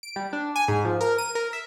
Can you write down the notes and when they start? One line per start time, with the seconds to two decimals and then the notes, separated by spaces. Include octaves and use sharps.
0.03 D7
0.16 G3
0.33 D4
0.56 G#5
0.68 G#2
0.85 F3
1.01 A#4
1.18 D#7
1.35 A#4
1.53 E5